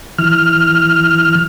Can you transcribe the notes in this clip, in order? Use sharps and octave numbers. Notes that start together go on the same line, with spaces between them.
E3 F6